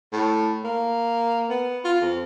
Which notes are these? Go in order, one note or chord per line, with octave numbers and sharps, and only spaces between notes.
A2
A#3
B3
F4
F2